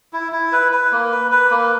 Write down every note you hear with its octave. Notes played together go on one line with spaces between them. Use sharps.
E4
E4
B4
B4
A#3
B4
B4
A#3